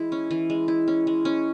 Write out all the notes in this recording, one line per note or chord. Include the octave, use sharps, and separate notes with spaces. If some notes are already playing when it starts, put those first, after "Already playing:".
Already playing: E3 G#3 E4
C#4
E3
G#3
E4
C#4
G#3
C#4